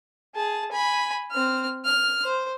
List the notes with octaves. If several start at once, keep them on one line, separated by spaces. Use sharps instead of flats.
G#4 A5
G#5 B5
C4 F6
F6
C5